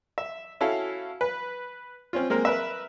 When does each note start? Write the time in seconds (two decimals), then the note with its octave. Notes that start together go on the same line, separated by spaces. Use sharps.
0.18 E5
0.61 C#4 E4 F#4 A4 F5
1.21 B4
2.13 C4 C#4 F4
2.30 G#3 A#3 C4 A#4
2.45 A#4 B4 E5